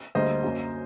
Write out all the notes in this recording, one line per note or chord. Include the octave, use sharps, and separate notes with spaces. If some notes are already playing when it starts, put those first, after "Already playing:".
D2 D3 G3 A#3 C5 D#5
F#2 F#3 A#3